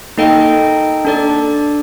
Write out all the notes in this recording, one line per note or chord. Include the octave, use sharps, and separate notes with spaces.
A#3 D#4 A4 D#5 G5
D4 A4 D5